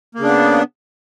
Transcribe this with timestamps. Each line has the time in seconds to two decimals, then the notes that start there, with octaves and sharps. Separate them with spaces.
0.15 A#3
0.19 C#3
0.23 D4
0.27 B3